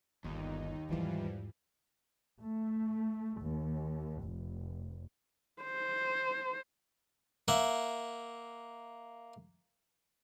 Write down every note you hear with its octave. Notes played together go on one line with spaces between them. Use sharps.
G1 D#2 D#4
E2 G#2 E3 F3 G3
A3
D#2
F1
C5
A#3 E5 F#5